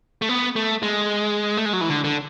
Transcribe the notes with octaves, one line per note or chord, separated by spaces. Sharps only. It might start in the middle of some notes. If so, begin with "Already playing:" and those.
A3
B3
A3
G#3
A3
G#3
F#3
E3
D3
D3